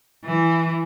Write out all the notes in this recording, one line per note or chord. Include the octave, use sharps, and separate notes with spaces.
E3